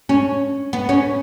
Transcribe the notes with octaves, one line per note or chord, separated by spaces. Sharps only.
C#4
B3
C#4